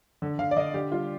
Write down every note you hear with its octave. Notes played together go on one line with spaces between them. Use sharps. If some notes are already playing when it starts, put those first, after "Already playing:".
D3
D3 F5
D5
D3 D#5
D3 G4
G3 F4